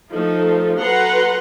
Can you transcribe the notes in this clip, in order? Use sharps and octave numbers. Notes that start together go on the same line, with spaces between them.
F3 A3 D#4
F#3 A4 B4 F#5 A#5 C6